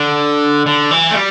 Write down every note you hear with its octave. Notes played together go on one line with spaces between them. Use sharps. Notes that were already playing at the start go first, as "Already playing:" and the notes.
Already playing: D3
D3
E3
A3
G3